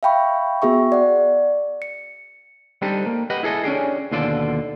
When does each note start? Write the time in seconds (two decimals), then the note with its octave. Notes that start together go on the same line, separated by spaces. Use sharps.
0.03 E5 F5 G5 B5 C#6
0.62 B3 F#4 G#4 E5 C#6
0.92 D5 F#5
1.82 C#7
2.82 G3 C4 D4 D#4 G4 A4
3.06 A#3
3.30 G4 B4 D#5 F#5
3.43 E4 G#4 A4 D#5
3.64 C#4 D4 G4 G#4
4.12 D#2 B2 D3 F4 A4 D5